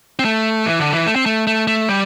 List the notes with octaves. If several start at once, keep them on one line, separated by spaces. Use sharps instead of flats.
C4
A3
E3
D3
E3
A3
C4
A3
A3
A3
G3